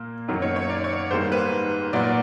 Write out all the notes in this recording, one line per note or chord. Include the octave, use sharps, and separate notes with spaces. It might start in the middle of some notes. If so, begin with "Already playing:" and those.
Already playing: A#2 A#3
F#2 D#3 F#3 A#3
C#5
C#5
D5
C#5
G#2 D#3 G3 A#3 C5
B4
A#2 F#3 B3 D5